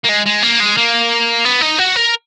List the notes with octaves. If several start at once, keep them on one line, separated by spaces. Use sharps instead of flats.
A#3
G#3
G#3
A#3
G#3
A#3
B3
D#4
F#4
A#4